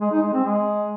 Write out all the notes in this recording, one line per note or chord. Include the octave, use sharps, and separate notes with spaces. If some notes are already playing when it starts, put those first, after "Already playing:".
G#3
D#4
G#3
C4
G#3